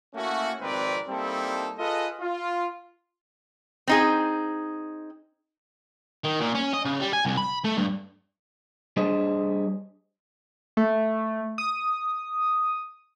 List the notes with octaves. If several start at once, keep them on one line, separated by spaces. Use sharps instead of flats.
A3 A#3 C#4 E4 F#4
G#1 F2 C4 A#4 B4 D5
G3 A#3 C4 D#4 E4 A4
F4 G#4 A4 B4 D#5
F4
C4 D#4 G#4
D#3
A#2
C#4
D#5
C#3
G3
G#5
C2
B5
A3
G2
G3 D4 G#4 C5 C#5 D#5
A3
D#6